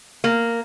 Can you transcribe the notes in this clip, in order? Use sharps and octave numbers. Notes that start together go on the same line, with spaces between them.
A#3